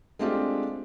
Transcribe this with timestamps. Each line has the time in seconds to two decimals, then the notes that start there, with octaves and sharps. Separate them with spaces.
0.19 G#3 A3 C4 D4 F4 G4